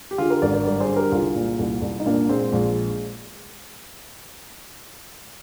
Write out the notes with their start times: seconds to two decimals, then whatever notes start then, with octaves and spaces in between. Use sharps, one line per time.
0.11 G4
0.18 D3 F4 G#4
0.30 G4 A#4
0.42 G#1 A#4 D5
0.53 A#4 D5
0.65 G2 A#4 D5
0.76 D5
0.80 G#4 C5
0.89 D3
0.96 G4 A#4
1.12 C2 F4 G#4
1.36 A#2
1.59 C2
1.82 C2
2.00 D#4
2.06 A#2 A#3 D4
2.29 A#2 G#3 C4
2.52 A#1 G#3